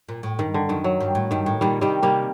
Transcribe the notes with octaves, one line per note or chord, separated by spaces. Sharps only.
A#2
A2
G2 D#3
D3
F#2 D#3
F#3
G2
A2
G2 D#3
A2
A#2 D#3 G3
C3 D#3 G3
C3 G3 A#3